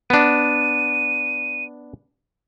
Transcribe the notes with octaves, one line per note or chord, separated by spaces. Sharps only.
B3 D4 D#7